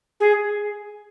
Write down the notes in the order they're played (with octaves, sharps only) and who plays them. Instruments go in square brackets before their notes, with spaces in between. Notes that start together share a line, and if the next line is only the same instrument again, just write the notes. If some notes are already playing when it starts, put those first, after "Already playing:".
[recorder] G#4